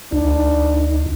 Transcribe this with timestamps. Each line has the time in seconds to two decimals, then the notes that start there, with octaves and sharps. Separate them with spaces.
0.12 D2 D4 D#4